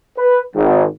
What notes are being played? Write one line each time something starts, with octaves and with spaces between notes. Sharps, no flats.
B4
G#1